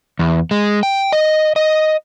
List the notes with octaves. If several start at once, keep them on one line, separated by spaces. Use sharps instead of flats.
E2
G#3
G5
D#5
D#5